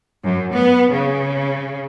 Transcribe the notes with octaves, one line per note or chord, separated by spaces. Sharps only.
F#2
B3
C#3